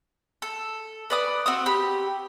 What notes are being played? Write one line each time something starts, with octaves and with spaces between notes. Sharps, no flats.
A4
B4 D5 D#6
C4 F#4 D#6
G4 B5